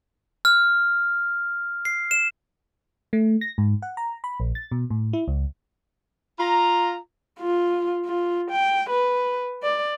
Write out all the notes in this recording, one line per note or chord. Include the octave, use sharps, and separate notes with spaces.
F6
C7
E7
A3
A#6
G#2
F#5
A#5
B5
A#1
A6
B2
A2
E4
C#2
F4 A#5
F4
F4
G5
B4
D5